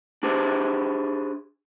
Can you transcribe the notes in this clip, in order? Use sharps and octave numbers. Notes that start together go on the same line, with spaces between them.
D4 G4 G#4 C5